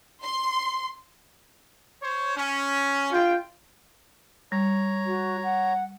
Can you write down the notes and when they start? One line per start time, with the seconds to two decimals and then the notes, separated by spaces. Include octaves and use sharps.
0.22 C6
2.03 C5 C#5
2.36 C#4
3.13 F4 G5
4.52 G3 C#5 A#5
5.06 F#4
5.43 F#5